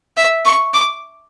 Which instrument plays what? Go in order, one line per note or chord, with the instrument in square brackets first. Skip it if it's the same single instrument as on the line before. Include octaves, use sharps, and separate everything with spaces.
[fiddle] E5
C#6
D6